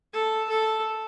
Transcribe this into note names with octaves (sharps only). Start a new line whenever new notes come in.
A4
A4